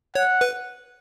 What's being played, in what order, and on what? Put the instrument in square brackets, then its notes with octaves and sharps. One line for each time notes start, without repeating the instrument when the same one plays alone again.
[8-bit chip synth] C#5 [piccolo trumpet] F#5
[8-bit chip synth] B4